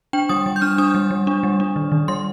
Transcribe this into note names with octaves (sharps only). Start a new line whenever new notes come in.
D4 G5
G3 D#6
G3
G6
D4 F6
D4 D#6
G3
G3
D4
G3
D4
D#3
D#3
G3 C6